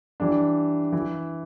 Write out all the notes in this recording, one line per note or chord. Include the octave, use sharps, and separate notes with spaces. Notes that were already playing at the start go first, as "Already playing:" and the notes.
E3 G3 D4
E3